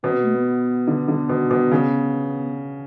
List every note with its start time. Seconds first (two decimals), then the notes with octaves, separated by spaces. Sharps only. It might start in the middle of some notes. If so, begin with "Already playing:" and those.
0.03 B2 C#4
0.14 B3
0.24 A3
0.34 B3
0.88 D3
1.08 D3
1.29 B2
1.51 B2
1.71 C#3